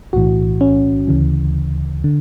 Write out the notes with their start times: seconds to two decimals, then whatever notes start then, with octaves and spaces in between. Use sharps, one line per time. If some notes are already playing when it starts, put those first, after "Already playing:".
0.13 B1 A2 E3 F#4
0.61 C#4
1.07 D2 C#3 E3
2.04 D3